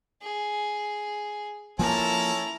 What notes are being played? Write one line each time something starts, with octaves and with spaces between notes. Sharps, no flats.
G#4
F3 A#3 C#4 E4 A4 A5 A#5